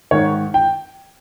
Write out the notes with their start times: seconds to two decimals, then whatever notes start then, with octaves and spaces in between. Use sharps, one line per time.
0.11 G#2 D#3 C#5
0.54 G5